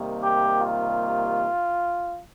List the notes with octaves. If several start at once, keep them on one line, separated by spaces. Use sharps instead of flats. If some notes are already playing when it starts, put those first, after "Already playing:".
Already playing: C3 D#3 G3 A#3
G4
F4